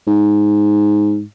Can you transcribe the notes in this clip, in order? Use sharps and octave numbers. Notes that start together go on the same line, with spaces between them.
G#2